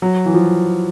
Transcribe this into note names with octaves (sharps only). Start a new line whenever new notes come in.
F#3
E3
F3